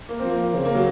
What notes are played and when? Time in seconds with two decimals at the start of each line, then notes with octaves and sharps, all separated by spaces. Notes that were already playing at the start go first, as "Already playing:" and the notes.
0.09 A#3
0.20 F3 C4
0.30 A#3
0.55 C#3 C4
0.65 A#3
0.75 F#3